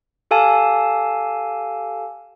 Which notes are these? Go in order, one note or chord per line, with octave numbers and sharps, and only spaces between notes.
G4 A4 F5 G#5 A5